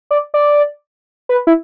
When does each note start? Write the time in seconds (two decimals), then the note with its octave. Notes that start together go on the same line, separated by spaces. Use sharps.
0.11 D5
0.34 D5
1.29 B4
1.47 E4